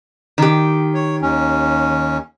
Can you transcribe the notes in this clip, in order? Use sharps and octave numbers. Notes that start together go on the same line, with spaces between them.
D#3 G4
C#5
D#2 C#4